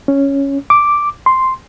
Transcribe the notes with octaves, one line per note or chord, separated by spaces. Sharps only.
C#4
D6
C6